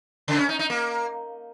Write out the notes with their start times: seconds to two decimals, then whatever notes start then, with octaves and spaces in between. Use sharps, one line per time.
0.28 C#3
0.38 C#4
0.49 D#4
0.59 D#4
0.70 A#3